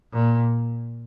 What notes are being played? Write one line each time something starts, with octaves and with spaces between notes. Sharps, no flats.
A#2